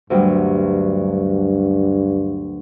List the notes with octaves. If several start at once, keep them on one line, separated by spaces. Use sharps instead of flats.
D2 G2 F#3 G3